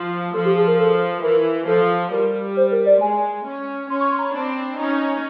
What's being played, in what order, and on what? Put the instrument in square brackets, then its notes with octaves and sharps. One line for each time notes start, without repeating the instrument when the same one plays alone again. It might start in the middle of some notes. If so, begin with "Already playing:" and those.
Already playing: [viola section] F3
[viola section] F3 [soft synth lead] A4
[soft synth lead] G4
G#4
A#4
A4
[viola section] E3 [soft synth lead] A#4
[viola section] F3 [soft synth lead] A4
[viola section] G3 [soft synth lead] A#4
[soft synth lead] C5
A#4
D5
[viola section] G#3 [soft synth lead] G#5
[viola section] C#4
[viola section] C#4 [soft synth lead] C6
[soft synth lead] C#6
C6
A#5
B5
[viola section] C4 D4
C#4 D#4